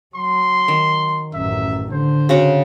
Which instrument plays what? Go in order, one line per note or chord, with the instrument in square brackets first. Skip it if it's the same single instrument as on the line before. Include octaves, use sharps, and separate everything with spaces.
[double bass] F#3 [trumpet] C6
[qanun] D#3
[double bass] A1 F#2 [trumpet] E5
[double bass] D3 [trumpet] C5
[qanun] C#3 F#4 F#5